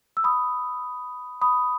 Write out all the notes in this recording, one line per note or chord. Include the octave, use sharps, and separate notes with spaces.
E6
B5 D#6
B5 D#6